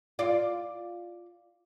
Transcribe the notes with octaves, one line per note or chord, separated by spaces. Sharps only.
F4 D5